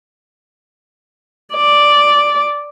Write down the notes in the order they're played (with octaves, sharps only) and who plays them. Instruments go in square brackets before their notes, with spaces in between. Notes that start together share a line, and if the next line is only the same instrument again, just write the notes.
[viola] D5